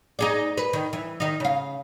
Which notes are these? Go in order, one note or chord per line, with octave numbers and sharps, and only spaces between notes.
D#4 G#4 D5
B4
D#3
E3
D#3 D#4
C#3 F5